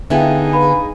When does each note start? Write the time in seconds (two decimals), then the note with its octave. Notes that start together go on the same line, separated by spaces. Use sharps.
0.10 D3 B3 D#4 E4 G#4 E5 F5 G5
0.53 B4 F5 B5